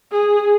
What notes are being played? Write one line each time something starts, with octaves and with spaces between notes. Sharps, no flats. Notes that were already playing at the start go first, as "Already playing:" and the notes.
G#4